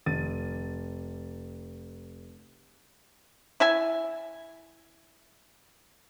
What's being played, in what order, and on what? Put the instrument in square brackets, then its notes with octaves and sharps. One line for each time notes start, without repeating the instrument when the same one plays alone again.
[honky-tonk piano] F1 A6 D#7
[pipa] E4 E5 G#5